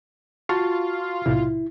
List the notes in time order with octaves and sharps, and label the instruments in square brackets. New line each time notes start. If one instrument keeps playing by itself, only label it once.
[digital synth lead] F4 [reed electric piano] F#4 A5 C#6
[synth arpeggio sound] B1 A2 C3 [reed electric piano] E4